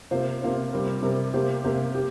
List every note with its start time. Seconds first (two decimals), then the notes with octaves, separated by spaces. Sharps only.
0.11 C3 A#3 F4 C5
0.42 C3 A#3 F4 C5
0.73 C3 G3 C4 A#4
1.03 C3 G3 C4 A#4
1.34 C3 A#3 G4 C5
1.64 C3 A#3 G4 C5
1.95 G4